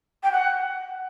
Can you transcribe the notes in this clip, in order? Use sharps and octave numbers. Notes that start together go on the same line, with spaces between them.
G5
F#5